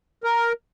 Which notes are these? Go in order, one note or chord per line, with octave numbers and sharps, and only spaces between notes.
A#4